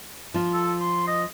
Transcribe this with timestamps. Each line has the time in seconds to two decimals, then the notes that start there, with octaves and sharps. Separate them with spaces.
0.34 F3 F4
0.54 A4
0.80 C6
1.07 D#5